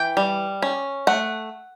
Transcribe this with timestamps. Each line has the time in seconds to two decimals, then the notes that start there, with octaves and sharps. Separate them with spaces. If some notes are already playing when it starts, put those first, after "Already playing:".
Already playing: E3 G5
0.17 G3
0.62 C#4
1.07 A3 F#5